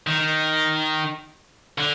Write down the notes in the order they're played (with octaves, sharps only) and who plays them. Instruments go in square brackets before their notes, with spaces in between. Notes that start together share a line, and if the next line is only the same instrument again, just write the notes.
[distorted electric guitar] D#3
D3